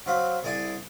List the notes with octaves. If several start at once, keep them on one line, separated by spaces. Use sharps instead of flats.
F#3 C4 F5 B5
C2 E4 G#4 D5 G#5